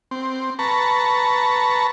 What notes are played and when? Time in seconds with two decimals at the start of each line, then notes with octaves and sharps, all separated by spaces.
0.11 C4
0.59 B4 A5 A#5 C#6